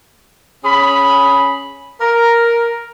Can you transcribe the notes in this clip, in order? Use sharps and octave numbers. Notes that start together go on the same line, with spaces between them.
C#4 G#4 B5
A#4